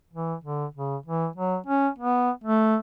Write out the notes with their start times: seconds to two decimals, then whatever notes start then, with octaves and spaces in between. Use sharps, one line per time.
0.13 E3
0.44 D3
0.75 C#3
1.06 E3
1.36 F#3
1.67 C#4
1.99 B3
2.44 A3